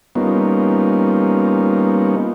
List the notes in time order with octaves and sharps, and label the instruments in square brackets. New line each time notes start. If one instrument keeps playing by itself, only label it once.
[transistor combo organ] G3 A#3 B3 C#4 D#4 F4